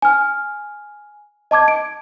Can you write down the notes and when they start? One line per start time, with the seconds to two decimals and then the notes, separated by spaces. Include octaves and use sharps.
0.02 G#5 F6
1.51 D#5 A5 D6 G#6
1.68 D7